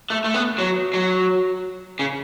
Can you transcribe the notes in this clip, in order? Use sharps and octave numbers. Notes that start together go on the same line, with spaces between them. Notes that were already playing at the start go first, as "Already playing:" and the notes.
A3
A3
B3
F#3
F#3
C#3